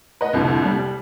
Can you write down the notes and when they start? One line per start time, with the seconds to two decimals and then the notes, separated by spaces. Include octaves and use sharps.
0.21 B4 D#5 F#5
0.33 C2 F2 D3
0.65 G3